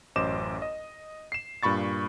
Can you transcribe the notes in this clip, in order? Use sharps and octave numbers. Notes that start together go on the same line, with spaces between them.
A1 F#2 C5 D#5 D6 E7
D#5
C7 E7
G2 A#2 B5 C#6 A6